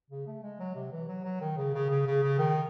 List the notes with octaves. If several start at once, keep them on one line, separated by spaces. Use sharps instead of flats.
C#3
A3
G#3
F#3
C3
E3
F#3
F#3
D#3
C#3
C#3
C#3
C#3
C#3
D#3